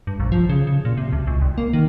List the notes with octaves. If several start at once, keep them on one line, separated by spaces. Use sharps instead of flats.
G2
A#1
F3
C#3
C#3
A#2
C3
D2
C#2
C2
A#3
D#3